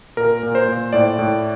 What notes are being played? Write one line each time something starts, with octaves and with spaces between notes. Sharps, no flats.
A#2 A#4
A#2
C5
A#2
A2 D5
A2